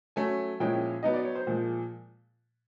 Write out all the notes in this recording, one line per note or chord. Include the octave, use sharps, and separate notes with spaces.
F#3 A3 C#4 G#5
A#2 F3 G#3 C#4 E4 G5
F#3 B3 D#4 D#5
D5
C#5
C5
A#2 F3 G#3